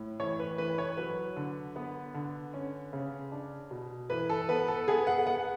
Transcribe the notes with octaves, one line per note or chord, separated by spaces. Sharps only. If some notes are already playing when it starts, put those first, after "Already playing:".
Already playing: A2
E3 C#5
B4
E3 B4
C#5
F#3 B4
D3
B3
D3
C#4
C#3
D4
B2
E3 B4
A4
B3 B4
A4
B3 G#4
F#5
B3 F#5